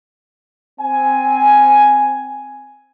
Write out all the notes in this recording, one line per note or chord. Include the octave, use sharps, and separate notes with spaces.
C4 G#5